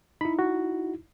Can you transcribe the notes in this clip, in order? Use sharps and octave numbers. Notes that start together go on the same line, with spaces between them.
D#4 E4 B5
F#4